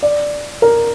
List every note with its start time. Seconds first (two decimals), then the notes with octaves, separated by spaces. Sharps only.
0.03 D5
0.62 A#4